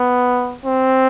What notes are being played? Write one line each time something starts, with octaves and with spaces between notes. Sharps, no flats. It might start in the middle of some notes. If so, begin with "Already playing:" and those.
Already playing: B3
C4